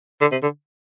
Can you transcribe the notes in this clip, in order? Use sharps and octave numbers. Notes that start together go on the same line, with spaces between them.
D3
C3
D3